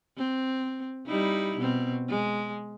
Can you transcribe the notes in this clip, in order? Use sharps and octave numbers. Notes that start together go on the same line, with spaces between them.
C4
G3 D#4 E4
B2 C4
G#3